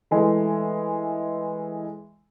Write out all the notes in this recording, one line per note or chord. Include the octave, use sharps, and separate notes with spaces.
E3 G#3 A3